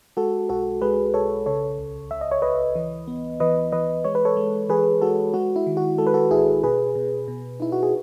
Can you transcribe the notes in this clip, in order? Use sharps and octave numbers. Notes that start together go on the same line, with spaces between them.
G#3 F#4 A4
B1 F#4 A4
G#3 G#4 B4
B1 A4 C#5
C#3 A4 C#5
C#2
C#2 E5
D#5
C#5
C#2 B4 D#5
E3
B3
E3 B4 D#5
E3 B4 D#5
G#3 C#5
B4
A4 C#5
G#3
E3 G#4 B4
G#3 F#4 A4
G#3 F#4
E4
D#3
F#4
G#3 A4
B4
F#4 A4
A1 E4 G#4
B2 G#4 B4
B2
B2
D#4 E4
F#4
G#4